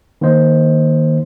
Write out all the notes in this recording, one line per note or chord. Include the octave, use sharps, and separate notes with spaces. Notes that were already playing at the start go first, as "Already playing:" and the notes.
D#3 A#3 D#4 C5 D#5